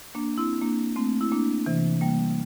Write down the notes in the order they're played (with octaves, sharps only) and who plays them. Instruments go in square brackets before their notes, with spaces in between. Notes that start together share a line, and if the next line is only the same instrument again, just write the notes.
[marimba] A#3 D4
C4 E4
A#3 D4
A3 C4
E4
A#3 D4
C3 E3
G3 A#3